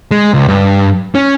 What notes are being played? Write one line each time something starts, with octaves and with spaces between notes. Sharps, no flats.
G#3
C#2
G2
C#4